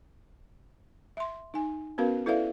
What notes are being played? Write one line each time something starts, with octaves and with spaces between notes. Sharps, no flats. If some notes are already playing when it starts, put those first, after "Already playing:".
E5 C6
D#4 G#5
B3 C#4 F#4 A#4 B4 F5
E4 A4 B4 D5 E5 F5